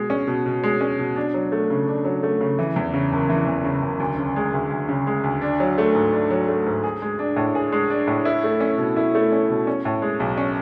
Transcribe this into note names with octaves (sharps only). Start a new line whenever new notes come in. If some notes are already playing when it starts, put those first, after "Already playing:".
Already playing: B2 G#3
C#4
B2
B2
G#3
C#4
B2
D4
F#3
A3
C#3
D4
F#3
A3
C#3
E3
E2
C#3
F#1
E3
E2
C#3
F#1
D2
C#3
G#3
D2
D2
C#3
G#3
D2
D4
F#3
A3
G#2
D4
F#3
A3
G#2
G#4
G#3
D4
A2
G#4
G#3
D4
A2
E4
A3
C#4
B2
E4
A3
C#4
B2
C#4
A2
G#3
B1
C#4